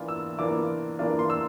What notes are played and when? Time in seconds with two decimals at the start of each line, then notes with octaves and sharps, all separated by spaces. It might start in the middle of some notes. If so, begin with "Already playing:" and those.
Already playing: E3 A#3 D4 F4
0.08 E6
0.38 E3 A#3 D4 F4 D6
0.99 E3 A#3 D4 F4
1.19 C6
1.30 E6